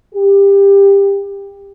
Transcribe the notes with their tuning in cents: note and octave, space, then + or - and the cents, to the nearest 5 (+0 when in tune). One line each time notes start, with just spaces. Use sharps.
G4 +20